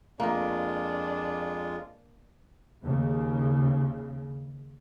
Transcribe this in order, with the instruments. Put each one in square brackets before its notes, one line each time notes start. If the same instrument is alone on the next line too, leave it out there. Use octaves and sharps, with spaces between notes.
[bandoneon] F2 G#3 F4 [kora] A#3 A#4 [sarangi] D4
[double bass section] D#2 C#3